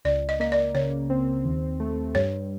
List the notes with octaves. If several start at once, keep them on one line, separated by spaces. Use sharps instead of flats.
C#2 D5
D#5
A#3 D#5
D5
C#3 C#5
C4
D#2
A3
G2 C#5